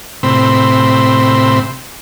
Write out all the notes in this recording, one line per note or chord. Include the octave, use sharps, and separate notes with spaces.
A2 C3 C4 B5 C6 E6